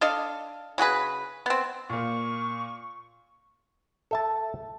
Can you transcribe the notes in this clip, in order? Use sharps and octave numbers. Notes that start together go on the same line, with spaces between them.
D4 A4 D#5 F5
C#3 F#4 G#4 B4
B3 C4
A#2 A#3 C#6
A4 E5 A5